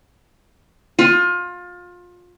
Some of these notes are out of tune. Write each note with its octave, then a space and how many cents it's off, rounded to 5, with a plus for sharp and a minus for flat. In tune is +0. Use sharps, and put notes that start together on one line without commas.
F4 +25